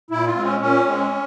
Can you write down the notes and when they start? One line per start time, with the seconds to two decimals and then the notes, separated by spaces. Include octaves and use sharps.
0.11 A#2 E4
0.27 F4
0.35 G#3 C4
0.44 C#4
0.60 A#2 C#4
0.87 G#3 C4